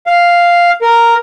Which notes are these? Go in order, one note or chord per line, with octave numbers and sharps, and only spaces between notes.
F5
A#4